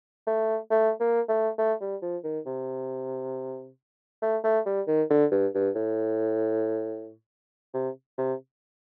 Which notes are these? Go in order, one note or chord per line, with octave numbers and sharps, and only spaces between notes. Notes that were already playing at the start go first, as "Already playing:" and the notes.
A3
A3
A#3
A3
A3
G3
F3
D#3
C3
A3
A3
G3
D#3
D3
G2
G2
A2
C3
C3